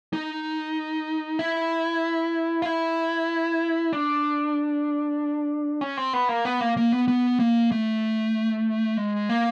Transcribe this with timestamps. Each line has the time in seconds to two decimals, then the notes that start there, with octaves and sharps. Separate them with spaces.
0.13 D#4
1.39 E4
2.62 F4
2.66 E4
3.93 D4
5.81 C#4
5.97 C4
6.13 B3
6.29 A#3
6.45 B3
6.61 A#3
6.77 A#3
6.92 B3
7.08 B3
7.40 A#3
7.72 A3
8.97 G#3
9.29 A#3